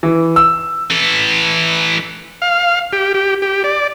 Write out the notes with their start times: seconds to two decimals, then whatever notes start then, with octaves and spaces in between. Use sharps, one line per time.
0.03 E3
0.36 E6
0.90 E3 A4
2.42 F5
2.93 G4
3.14 G4
3.42 G4
3.64 D5